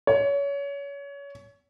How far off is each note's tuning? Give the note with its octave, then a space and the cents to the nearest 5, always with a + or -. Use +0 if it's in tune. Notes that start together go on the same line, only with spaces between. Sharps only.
C#5 +25